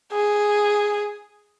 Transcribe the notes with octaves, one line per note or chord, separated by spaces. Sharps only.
G#4